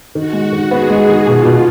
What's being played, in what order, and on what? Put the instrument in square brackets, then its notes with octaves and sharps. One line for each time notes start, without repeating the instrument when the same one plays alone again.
[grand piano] D#3 [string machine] F#4
[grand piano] G#3
D#3
[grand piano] B3 [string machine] G#4
[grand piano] G#3
D#3
[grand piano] B2 [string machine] F4
[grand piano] B2